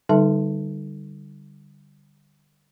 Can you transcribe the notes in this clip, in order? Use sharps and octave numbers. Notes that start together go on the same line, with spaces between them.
D3 G3 D#4 A4 E5 A5